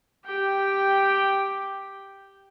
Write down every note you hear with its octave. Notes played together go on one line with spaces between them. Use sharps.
G4 G5